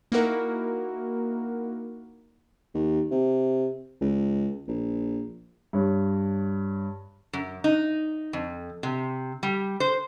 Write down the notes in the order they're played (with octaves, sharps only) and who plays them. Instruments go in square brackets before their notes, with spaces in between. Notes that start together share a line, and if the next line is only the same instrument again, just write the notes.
[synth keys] A#3 D#4 E4 F#4 A#4
[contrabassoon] D#2
C3
C#2
A#1
[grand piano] G2 C#5
[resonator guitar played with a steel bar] F#2
D#4
F2
C3
G3
C5